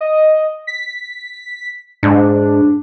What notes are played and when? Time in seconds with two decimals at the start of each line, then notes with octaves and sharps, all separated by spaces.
0.01 D#5
0.67 B6
2.03 G#2 D4